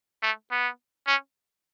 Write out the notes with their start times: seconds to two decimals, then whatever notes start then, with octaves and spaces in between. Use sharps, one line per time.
0.23 A3
0.51 B3
1.07 C#4